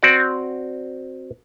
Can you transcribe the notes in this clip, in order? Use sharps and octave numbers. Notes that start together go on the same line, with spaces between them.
C4 F#4 D5